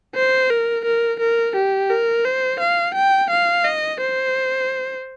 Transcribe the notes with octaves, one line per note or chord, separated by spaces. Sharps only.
C5
A#4
A#4
A#4
G4
A#4
C5
F5
G5
F5
D#5
C5